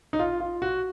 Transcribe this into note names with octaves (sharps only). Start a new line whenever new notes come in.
D#4
F4
F4
F#4